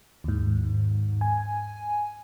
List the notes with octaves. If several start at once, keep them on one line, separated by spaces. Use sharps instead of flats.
D#2 G#2
G#5